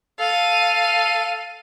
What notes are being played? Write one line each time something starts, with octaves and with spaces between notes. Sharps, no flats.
A4 F5 D#7